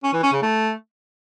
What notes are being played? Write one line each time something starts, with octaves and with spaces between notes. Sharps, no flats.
C#4
E3
C#4
C#3
A3